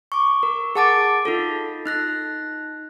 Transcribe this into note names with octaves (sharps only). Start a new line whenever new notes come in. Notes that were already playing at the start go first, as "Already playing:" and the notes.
C#6 D6
A#4
G#4 F#5 A5 D6 A6 D7
D#4 F4 A4
D#4 F#6 A#6